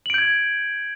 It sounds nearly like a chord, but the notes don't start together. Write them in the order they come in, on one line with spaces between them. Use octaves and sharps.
F#7 D7 G6 G#6